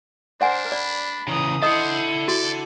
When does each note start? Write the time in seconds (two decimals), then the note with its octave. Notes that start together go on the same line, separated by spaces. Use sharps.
0.41 D4 A#4 C5 D5 F#5 G#5
0.72 D5 B5
1.28 C#3 E3 A#5 D#6
1.62 E4 A4 C5 D#5 F#5 D#6
2.28 F#4 D5